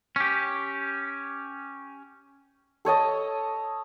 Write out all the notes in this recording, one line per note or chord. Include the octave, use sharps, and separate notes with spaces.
C#4 G4
A4 C#5 D#5 A5